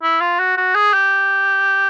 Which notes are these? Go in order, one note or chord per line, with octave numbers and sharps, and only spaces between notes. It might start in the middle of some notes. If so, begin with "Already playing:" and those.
E4
F4
F#4
F#4
G#4
G4